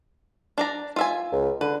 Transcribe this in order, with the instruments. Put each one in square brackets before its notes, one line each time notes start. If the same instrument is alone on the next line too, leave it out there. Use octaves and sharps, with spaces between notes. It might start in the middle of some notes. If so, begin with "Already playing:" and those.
[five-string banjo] D4 D5 A#5
F4 E5 G#5
[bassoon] C#2
[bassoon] D3 [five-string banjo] B4